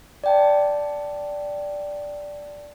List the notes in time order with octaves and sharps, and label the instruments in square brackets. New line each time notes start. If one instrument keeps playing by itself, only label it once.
[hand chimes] D5 G5 A5